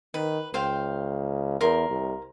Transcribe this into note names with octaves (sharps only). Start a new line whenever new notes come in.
D#3 B4
C#2 C5 F5 G5
E2 A#4 C6
C2